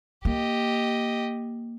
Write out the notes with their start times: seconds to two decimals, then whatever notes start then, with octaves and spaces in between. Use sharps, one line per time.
0.25 A#3 G4 D#5